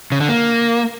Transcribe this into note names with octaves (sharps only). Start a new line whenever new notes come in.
C#3
D3
A#3